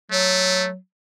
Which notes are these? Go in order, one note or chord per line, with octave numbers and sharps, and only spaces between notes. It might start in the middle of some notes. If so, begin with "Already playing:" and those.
F#3 A3